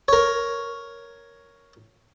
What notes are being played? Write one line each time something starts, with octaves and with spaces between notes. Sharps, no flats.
A#4 C#5